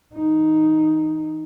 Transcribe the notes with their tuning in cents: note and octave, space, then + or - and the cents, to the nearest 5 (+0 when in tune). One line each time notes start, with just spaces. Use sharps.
E3 -30 D#4 +0